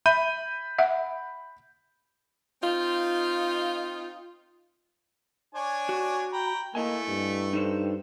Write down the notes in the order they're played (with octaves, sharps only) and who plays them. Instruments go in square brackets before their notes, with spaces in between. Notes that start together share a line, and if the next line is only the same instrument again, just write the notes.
[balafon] E5 [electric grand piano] B5 G6 D#7
[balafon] E5 F#5
[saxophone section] C4 D#4 F4
[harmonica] D4 C#5 G#5
[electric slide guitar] F#4
[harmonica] G5 A#5 B5
[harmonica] A3 [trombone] A#3 [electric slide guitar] E4 D#5 G#5
[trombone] G2
[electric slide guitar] D#4 A4 C5